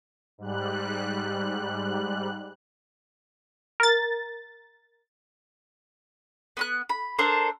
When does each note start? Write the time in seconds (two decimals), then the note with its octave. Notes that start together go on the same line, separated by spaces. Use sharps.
0.38 G#2 G3 F#6
3.80 A#4 A6
6.57 B3 B5 F#6
6.89 B5
7.19 D4 A4 A#4 C5